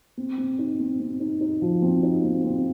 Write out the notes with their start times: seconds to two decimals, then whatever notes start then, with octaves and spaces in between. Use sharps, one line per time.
0.17 C4
0.38 C4
0.59 D#4
0.80 C4
1.00 C4
1.20 D#4
1.41 D#4
1.62 F3
1.82 C4
2.03 D#4
2.24 C4
2.44 C4